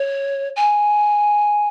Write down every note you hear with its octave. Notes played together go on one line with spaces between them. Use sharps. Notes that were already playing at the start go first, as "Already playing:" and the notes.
Already playing: C#5
G#5